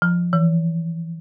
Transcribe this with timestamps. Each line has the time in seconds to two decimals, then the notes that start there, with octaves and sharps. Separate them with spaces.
0.02 F3
0.33 E3